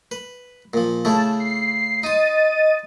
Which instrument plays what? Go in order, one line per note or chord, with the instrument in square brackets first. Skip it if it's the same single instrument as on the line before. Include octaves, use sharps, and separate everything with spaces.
[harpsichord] B4
A#2 F3
[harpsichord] C#3 A3 E4 [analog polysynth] A5
[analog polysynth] C7
[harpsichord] D#4 C6 [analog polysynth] D#5 A6 D#7